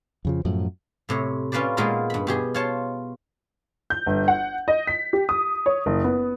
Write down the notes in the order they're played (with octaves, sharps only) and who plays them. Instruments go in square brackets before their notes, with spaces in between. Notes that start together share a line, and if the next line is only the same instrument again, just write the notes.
[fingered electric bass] F2 C#3 F3
F#2 A2 F3
[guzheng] A2 C3 C#5
C#4 F4 B4 C5 D5
A#2 G#3 B3 D#4 F4 A#4
G2 B5
B2 G4 G#4
F4 C#5 A5
[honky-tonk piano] G6
G1
F#5
D#5
B6
G4
D#6
C#5
F#1
B3